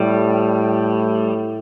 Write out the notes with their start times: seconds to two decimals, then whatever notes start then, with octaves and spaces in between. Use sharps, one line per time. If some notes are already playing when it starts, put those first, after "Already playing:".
Already playing: A2 G3